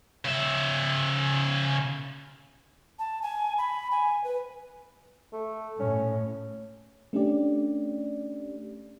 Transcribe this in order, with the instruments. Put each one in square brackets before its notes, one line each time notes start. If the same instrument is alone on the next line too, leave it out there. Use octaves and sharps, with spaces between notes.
[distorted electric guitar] C#3 E5
[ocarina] A5
G#5
B5
G#5
B4
[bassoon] A3
[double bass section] A2 [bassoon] C#4
[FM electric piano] A3 C#4 D4 G4 D5